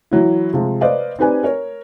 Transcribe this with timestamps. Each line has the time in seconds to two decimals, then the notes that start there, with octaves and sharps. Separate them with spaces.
0.11 E3 F#3 E4
0.53 C3 F3 G#3
0.81 B4 C5 D5 D#5 F5
1.19 C4 D#4 G4 B4 D5 G#5
1.43 A#4 C#5